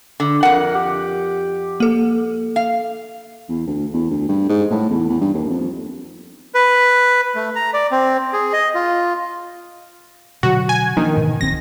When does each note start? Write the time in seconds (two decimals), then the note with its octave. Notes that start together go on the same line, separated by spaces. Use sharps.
0.20 D3
0.43 F2 A#4 F#5
0.75 G4
1.80 A#3 A4
2.56 F5
3.49 E2
3.67 D2
3.93 E2
4.10 D2
4.28 G2
4.49 G#2
4.70 A2
4.90 E2
5.09 E2
5.21 G2
5.34 D#2
5.50 F2
6.55 B4
7.35 A3
7.56 A#5
7.74 D5
7.92 C4
8.33 G#4
8.53 D#5
8.75 F4
10.43 B2 D3 F#3 F#4
10.69 G#5
10.97 D#3 F3 A#3 D4
11.17 G#2 B2 E3
11.41 D1 B1 C4 A#6